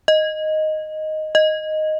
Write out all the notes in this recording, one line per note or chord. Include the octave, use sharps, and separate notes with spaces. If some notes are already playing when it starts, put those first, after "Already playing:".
D#5
D#5